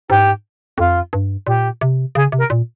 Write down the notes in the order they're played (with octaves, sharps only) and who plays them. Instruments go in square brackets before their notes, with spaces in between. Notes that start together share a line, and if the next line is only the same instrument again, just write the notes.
[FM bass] G#2 [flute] G4
[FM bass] F2 [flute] F4
[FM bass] G2
[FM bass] A#2 [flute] G4
[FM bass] C3
[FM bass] C#3 [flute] G#4
[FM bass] C3
[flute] A#4
[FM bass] A#2